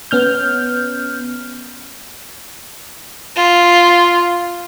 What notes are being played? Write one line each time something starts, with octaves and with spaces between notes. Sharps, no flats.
B3 C#4 F6 G6
F4